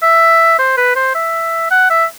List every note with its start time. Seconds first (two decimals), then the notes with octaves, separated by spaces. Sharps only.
0.03 E5
0.59 C5
0.77 B4
0.96 C5
1.15 E5
1.71 F#5
1.90 E5